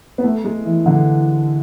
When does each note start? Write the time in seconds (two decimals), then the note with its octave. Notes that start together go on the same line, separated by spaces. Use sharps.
0.18 B3
0.24 A3
0.44 G#3
0.65 E3
0.86 D3